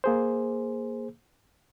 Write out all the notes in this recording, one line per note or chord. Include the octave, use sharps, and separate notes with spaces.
A#3 G#4 C5